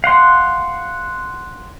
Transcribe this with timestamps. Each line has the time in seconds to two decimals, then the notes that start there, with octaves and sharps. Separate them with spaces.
0.04 F5 F#5 C6